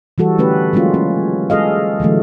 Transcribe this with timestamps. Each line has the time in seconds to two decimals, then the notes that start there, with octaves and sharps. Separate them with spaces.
0.18 E3 G3 F#4 A4
0.38 D3 A3 C#4 G4 B4
0.73 F#3 G#3 A#3 C#4 F4
0.94 C#4
1.50 G#3 G#4 A4 D#5 F5
2.00 D3 E3 F#3 A3